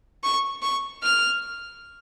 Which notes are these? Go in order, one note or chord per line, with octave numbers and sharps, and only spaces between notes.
C#6
C#6
F6